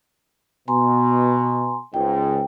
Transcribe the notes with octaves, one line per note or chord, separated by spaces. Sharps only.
B2 G#5 A#5 C6
C#2 G#2 G5